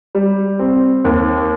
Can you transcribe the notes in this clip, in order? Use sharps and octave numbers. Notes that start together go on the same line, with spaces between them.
G3
C4
D#2